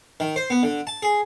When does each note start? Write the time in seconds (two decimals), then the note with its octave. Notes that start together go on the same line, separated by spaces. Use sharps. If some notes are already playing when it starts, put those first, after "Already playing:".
0.20 D#3
0.36 C5
0.50 B3
0.63 D3
0.87 A5
1.03 G#4